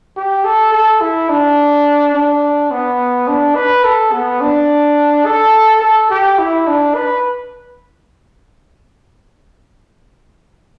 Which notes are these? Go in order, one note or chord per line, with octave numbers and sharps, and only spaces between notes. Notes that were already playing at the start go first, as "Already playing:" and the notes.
G4
A4
A4
E4
D4
D4
B3
D4
B4
A4
B3
D4
A4
A4
G4
E4
D4
B4